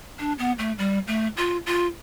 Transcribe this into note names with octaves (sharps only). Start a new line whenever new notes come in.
D4
B3
A3
G3
A3
F4
F4